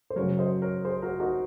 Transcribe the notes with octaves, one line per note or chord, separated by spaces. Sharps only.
C5
F#2 C#3 F#3 A#4 C#5
C5 D#5
A#4 C#5
G#4 C5
F#4 A#4
D#4 F#4